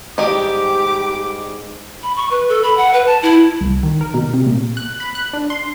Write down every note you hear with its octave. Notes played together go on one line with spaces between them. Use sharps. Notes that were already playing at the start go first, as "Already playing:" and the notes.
G#2 G3 G4 D#5 D6
B5
C#6
B4
A4
B5
F#5
B4
A5
E4
C2
D#3
A#4
B2
C3
A#2
F#6
B5
F#6
D4
C6